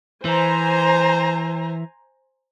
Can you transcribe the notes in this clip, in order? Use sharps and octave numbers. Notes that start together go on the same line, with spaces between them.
E3 C5 G#5 A#5